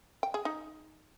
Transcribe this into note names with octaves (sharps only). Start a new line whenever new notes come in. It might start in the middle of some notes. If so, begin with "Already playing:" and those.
G5
G#4
D#4